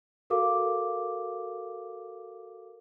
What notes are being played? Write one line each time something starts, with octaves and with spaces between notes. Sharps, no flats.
F#4 A4 A#4 F5 D6